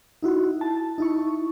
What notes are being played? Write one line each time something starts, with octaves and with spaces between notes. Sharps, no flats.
D#4 E4 F#4
A5
D#4 E4 C#6